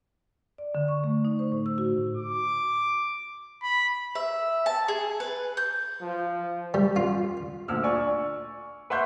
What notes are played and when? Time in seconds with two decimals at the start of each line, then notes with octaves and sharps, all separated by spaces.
0.58 D5
0.75 D3
0.88 C#6
1.04 A3
1.25 D#4
1.39 C5
1.52 A2
1.66 E6
1.78 F#4
2.17 D6
3.63 B5
4.15 E5
4.66 A5
4.88 G#4
5.20 B4
5.57 G6
6.01 F3
6.74 G3
6.96 F4
7.68 D2 A#2 E6 F6
7.83 D5 G#5 C#6
8.90 B4 E5 F#5 C6 C#6 G6